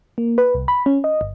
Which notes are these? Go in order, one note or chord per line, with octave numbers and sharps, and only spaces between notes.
A#3
B4
C2
B5
C#4
D#5
G1